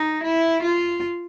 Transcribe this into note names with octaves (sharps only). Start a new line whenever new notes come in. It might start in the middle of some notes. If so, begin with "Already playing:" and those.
Already playing: D#4
E4
F4